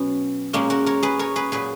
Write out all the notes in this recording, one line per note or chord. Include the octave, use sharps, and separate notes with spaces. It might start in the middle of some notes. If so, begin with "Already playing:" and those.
Already playing: B2 F#3 B3 C#4
A#2 G#3 A#3 C#4
F#4 A#4
A#4 C#5
G#4 B4
A#4 C#5
G#4 B4
A#2 F#3 G#4 B4